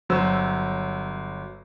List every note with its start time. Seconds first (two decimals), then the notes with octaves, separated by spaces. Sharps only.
0.09 G1 F#3 C5 E6